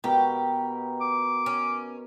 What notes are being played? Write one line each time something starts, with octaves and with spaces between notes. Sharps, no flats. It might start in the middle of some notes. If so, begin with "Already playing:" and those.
B2 G4 A#4
D6
C#4